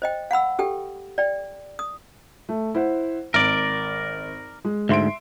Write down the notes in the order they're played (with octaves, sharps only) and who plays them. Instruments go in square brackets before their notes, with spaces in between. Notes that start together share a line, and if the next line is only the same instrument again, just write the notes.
[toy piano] C5 D#5 G5
F5 F#5 B5 E6
G4 A4 G5
D5 G5
D#6
[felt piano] A3
E4 C5 F#5
[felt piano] G#1 [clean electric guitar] A#4 D5
[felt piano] G#3
[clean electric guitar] D2 G#2 [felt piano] E5 C6 D7